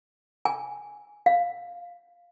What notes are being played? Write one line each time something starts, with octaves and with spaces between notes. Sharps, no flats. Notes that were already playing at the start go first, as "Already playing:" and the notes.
G#5
F5